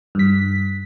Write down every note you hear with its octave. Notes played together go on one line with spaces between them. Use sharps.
G2 B6